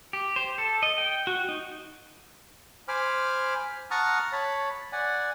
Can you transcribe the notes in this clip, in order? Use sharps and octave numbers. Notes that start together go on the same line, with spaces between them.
G4
C5
A4
D#5
G5
F#4
D#4
C5 G#5 B5 D6 F6
F#5 A5 A#5 C#6 D#6 F6
C#5 A5 B5
D5 F#5 G#5